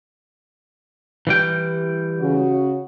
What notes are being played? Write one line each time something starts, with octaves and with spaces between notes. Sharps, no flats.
E3 G3 G5
C#3 F#4